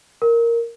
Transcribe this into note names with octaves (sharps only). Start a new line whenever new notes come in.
A#4